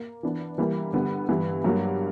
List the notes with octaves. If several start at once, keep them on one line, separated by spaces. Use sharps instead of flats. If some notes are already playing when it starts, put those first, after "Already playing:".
Already playing: A#3
E3 B3 D4
E3 G3 A#3 E4
D3 G3 B3
G2 E3 B3 E4
G2 F#3 A#3